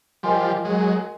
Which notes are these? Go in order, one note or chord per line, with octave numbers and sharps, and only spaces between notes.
F3 G3 A#4 D#5 G#5 C6
F#3 G#3